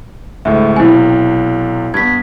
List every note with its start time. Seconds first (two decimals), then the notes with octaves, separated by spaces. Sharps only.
0.45 D2 A2 G#3 E5
0.76 B1 C3 E4 G#5
1.94 G2 B3 G#6 B6